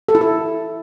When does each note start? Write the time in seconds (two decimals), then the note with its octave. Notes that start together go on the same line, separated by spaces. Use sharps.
0.09 A4
0.15 E4
0.21 A4